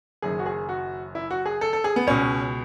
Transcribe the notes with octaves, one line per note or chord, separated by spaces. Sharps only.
F#1 F#2 D#3 G#4
F#4
G#4
F#4
E4
F#4
G#4
A4
A4
G#4
B3
C#2 B2 C#4